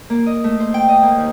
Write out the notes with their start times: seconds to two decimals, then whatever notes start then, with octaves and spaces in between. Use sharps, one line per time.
0.10 A#3
0.26 D#5
0.44 A3
0.60 C5
0.74 G5
0.89 D#5
1.03 A#3
1.17 D#2